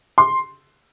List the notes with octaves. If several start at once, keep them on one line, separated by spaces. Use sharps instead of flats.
C6